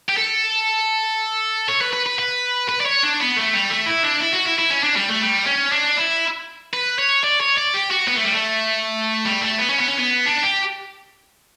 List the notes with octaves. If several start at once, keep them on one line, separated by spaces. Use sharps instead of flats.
G4
A4
C#5
B4
B4
B4
B4
B4
D5
C#5
D4
B3
A3
G3
A3
E4
D4
E4
F#4
E4
E4
C#4
D4
G3
A3
G3
C#4
D4
E4
B4
C#5
D5
C#5
D5
G4
F#4
B3
A3
G3
A3
G3
A3
B3
C#4
B3
C#4
B3
D4
G4